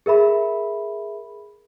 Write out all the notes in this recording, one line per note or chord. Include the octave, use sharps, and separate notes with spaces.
G#4 A#4 E5 B5